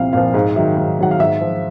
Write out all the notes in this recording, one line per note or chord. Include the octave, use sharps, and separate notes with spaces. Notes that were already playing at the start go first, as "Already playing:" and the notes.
Already playing: C2 A#2 F3 F5
A#2 F3 F5
G#2 F5
D#3 F#3 E5
G#2
D#3 F#3 F#5
F5
G#2 E5
F3